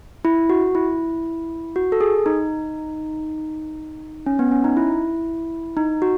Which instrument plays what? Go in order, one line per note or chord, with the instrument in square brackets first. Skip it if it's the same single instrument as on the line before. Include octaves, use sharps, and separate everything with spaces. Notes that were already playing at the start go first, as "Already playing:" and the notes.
[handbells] E4
F#4
E4
F#4
A4
G#4
D#4
C#4
B3
C#4
D#4
E4
D#4
F#4